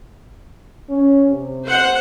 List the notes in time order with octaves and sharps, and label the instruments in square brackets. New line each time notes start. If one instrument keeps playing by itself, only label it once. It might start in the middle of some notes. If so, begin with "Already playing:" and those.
[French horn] C#4
C3
[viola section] C5 F#5